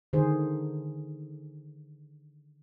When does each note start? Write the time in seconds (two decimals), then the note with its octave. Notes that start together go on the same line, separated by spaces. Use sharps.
0.13 D3 D#3 G#4 C5